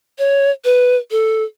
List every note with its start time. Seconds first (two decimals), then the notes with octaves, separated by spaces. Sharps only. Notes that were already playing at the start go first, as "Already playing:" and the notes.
0.18 C#5
0.65 B4
1.11 A4